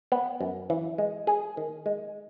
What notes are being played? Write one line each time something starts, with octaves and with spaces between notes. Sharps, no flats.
B3
F#2
E3
G#3
G#4
D#3
G#3